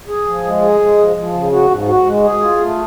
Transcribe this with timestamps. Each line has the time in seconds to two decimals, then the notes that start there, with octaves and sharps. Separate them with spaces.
0.08 G#4
0.26 F3
0.44 G#3
0.62 G#4
0.80 G#3
0.98 F3
1.16 F3
1.34 C#3
1.52 F#4
1.70 G#2
1.88 F#4
2.06 G#3
2.24 G#4
2.42 F4
2.60 A3